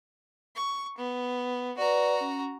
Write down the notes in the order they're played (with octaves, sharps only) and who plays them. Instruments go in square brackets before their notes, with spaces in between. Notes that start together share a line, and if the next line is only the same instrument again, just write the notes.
[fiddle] C#6
B3
[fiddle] F#4 A#5 [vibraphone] B4 D5
[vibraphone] C#4